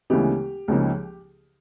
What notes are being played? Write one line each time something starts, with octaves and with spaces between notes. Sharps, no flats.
D2 C#3 E3 G#3 B3 G4
C#2 C#3 F3 A#3 D#4